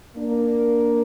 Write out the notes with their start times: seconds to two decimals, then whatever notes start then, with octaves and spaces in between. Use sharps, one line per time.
0.17 A#3 D4 A#4